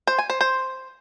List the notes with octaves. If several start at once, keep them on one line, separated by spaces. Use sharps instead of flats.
C5
G#5
C5
C5